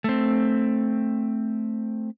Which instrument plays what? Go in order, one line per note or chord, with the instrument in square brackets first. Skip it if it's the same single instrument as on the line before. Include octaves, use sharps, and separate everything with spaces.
[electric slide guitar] A3 C4